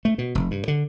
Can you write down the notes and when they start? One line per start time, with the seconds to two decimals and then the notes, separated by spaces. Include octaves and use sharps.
0.05 A3
0.18 B2
0.35 F1
0.51 G2
0.68 D3